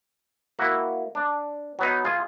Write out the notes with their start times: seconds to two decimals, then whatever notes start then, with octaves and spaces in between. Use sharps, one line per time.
0.59 A#3 E4 F#4
1.15 D4
1.79 F#3 B3 D#4
2.05 F4 G#4